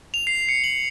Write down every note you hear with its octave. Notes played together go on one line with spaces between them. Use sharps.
F7
C7
C#7
F#7